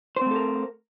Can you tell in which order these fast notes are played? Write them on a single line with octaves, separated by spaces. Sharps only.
C5 C4 A3 A4 A#4